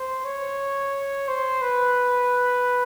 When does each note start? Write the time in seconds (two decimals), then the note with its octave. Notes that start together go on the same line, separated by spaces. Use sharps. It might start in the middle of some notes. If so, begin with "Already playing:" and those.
Already playing: C5
0.25 C#5
1.28 C5
1.62 B4